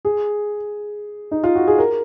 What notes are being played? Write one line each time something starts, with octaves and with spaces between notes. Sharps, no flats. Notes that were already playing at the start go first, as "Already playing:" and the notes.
G#4
D#4
F4
F#4
G#4
A#4